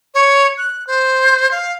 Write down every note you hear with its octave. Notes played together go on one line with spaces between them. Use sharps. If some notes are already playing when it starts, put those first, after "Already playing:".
C#5
F#6
C5
F5